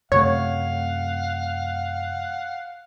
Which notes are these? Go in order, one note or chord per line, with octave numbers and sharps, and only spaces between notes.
F#2 C3 A3 C#5 F5 F#5